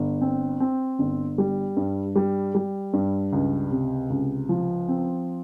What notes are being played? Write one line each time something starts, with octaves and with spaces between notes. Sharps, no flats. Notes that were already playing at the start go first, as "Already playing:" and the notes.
Already playing: G1
C4
C4
G1
G3
G2
G3
G3
G2
C#2
C3
C#2
F3
C4